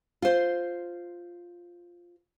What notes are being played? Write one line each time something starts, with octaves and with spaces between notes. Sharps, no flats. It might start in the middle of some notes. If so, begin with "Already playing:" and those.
F4 C5